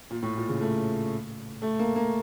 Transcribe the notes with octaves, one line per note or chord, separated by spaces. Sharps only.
A#2
A2
A#2
C#3
A3
A3
A#3
A#3